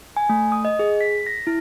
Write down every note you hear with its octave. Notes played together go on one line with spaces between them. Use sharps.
G#5
A3
D#6
D#5
G#4
B6
A#6
E4